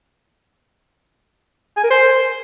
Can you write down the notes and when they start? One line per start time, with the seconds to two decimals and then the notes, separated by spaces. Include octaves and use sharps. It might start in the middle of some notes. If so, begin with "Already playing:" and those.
1.77 G#5
1.84 A#4
1.90 C5